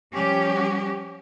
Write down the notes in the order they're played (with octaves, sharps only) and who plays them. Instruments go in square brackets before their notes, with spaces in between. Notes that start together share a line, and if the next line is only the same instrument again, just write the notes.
[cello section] F3 G3 C#4 G4